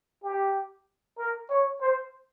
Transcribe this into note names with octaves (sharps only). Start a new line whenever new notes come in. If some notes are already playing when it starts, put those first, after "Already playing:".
G4
A#4
C#5
C5